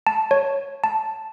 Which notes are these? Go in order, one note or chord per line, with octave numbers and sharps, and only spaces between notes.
A5
C#5
A5